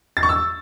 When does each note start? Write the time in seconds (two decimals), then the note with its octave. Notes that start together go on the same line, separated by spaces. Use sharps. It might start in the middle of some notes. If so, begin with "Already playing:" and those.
0.17 A6
0.23 C#6
0.29 E6